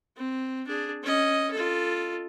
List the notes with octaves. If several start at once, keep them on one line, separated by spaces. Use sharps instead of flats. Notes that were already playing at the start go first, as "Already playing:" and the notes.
C4
D4 G#4
C#4 D#5
F4 A4